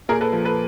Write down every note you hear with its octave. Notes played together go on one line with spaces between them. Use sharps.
A#2 G#4 A#4
A4 B4
F3
A4 B4